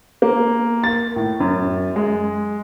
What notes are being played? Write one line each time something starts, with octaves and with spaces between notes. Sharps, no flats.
A#3
A6
A2
F#2
G#3